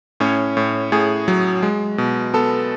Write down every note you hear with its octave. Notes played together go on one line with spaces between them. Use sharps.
A2 C#4 C#5
A2
A2 G#4 G#5
F#3
G#3
B2
B3 A4 A5